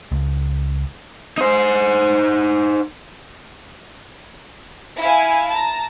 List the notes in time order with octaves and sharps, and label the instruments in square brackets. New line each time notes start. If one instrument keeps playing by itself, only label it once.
[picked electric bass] C#2
[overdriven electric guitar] D#4 C5
[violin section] E4 F5 G#5
A5 A#5